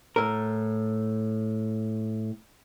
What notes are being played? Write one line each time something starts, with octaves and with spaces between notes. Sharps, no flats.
A2 A#4